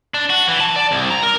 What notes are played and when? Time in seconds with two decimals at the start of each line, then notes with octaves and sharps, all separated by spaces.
0.14 D4
0.30 F#4
0.48 E3
0.60 A5
0.76 D5
0.92 C2
1.10 A#5
1.23 A#4